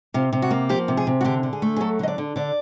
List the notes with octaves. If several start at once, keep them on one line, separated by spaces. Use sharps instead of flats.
C3 F4
C3
F#4
A#3
F3 G4
C3
G#4
C3
F#4
D3 G4
D3
G#4
A3
G#4
F#3 A4
D3 D#5
D5
D3
D3 D5